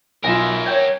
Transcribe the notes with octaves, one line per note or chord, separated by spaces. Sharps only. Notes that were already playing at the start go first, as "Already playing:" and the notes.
B1 F4 A#4 E5 G#5
C#5 G5 G6 G#6